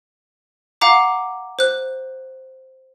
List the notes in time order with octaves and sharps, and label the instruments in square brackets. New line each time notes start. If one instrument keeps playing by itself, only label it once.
[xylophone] F5 F#5 A#5 D6
C5 F#6